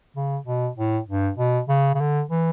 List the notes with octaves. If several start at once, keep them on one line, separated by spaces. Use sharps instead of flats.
C#3
B2
A2
G2
B2
C#3
C#3
D3
E3